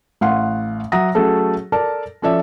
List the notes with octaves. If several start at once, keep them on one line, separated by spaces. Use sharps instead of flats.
A1 F5 F#5 C6
F#3 E5 F#5 A#5 D#6 A#6
F#3 A3 C#4 F#4 G#4 A4
A4 A#4 D5 A5
F3 C#4 A4 D5 E5